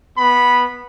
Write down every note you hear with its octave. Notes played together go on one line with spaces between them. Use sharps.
B3 B5